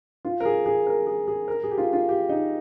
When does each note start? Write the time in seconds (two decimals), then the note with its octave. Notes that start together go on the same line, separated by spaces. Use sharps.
0.25 F4
0.40 A#4
0.45 G#4
0.66 G#4
0.87 A#4
1.07 G#4
1.28 G#4
1.48 A#4
1.64 G#4
1.71 G4
1.78 F4
1.93 F4
2.09 G4
2.29 D#4